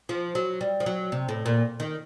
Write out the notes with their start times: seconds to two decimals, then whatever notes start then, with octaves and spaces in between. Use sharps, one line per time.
0.09 F3
0.35 F#3
0.61 G3
0.80 F3
0.86 F#3
1.12 C3
1.29 A2
1.46 A#2
1.80 D#3